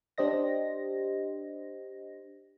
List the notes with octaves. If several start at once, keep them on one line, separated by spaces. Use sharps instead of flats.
D4 G4 C5 D#5 A#6